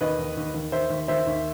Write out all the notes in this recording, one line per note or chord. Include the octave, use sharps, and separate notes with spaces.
D#2 B4 D#5
D#2
D#2
D#2
D#2 C5 E5
D#2
D#2 C5 E5
D#2